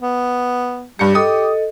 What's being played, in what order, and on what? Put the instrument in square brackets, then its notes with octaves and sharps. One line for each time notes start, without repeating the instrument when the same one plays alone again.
[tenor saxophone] B3
[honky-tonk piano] G2 C#7 [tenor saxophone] G3 [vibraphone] G4
[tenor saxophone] G4 [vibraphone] A4 D#5 [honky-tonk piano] D#6